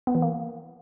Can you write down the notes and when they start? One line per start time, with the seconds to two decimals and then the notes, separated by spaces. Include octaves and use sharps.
0.07 B3
0.15 E3
0.22 A#3